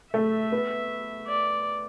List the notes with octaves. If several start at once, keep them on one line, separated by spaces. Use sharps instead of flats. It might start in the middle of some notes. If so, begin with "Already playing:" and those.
A3 E5
B3
D5